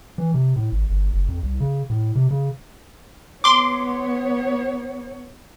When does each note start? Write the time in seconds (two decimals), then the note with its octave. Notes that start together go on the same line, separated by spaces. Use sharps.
0.18 E3
0.34 C3
0.56 A2
0.72 G#1
0.90 G1
1.14 F#1
1.29 F2
1.43 C2
1.60 C#3
1.90 A2
2.16 C3
2.31 C#3
3.44 B3 C#5 C6 D6